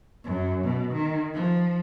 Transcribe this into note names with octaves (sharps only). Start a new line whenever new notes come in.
F#2
B2
D#3
F3